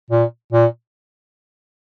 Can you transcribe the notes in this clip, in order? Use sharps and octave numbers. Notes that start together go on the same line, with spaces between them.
A#2
A#2